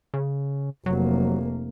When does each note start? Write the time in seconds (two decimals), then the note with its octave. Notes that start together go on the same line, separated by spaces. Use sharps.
0.14 C#3
0.86 F1 F#3 A#3